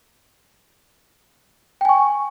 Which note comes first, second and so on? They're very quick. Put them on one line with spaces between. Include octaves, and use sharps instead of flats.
G5 G#5 C#6